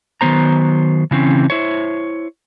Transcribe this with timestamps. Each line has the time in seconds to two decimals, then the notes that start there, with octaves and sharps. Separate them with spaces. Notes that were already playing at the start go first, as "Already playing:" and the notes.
0.21 D#3 F#3 B3 C5 A#5
1.11 C#3 E3 C4 C#4
1.50 E4 C5 C#5